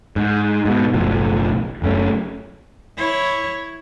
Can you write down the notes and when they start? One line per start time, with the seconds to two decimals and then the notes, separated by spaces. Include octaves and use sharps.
0.16 G#2
0.65 G#2 B2
0.94 F#1 B1 A2 F3
1.82 F#1 F#2 A3 C#4
2.97 E4 C#5